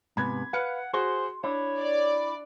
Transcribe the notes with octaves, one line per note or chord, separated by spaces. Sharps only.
G#2 C3 B3 B5 G#6
B4 F5 F#5 C#7
F#4 G#4 C5 C6
D4 E4 C#5
D5